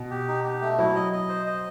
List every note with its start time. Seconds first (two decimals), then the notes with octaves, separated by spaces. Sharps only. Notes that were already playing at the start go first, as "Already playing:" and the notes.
Already playing: B2
0.11 G4
0.28 D#4
0.44 G4
0.61 A3
0.78 F#3 E4
0.96 D#5
1.13 D#5
1.29 C5
1.46 D#5